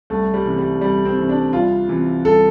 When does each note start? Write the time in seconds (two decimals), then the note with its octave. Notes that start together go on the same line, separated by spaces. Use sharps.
0.10 C2 A3
0.34 G3
0.46 C3 E3
0.58 G3
0.81 C2 G3
1.05 C4
1.18 C3 E3
1.29 D4
1.53 C2 F4
1.89 C3 E3
2.25 C2 A4